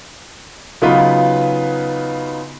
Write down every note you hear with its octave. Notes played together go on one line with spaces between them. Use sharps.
C#3 F#3 B3 D#4 F4 B4